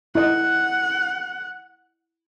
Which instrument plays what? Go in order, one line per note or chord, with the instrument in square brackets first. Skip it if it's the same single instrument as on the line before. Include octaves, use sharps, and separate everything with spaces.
[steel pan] E4 D#5 [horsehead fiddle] F#5